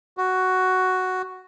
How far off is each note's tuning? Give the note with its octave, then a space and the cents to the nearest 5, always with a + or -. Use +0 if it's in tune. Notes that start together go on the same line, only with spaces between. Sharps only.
F#4 +5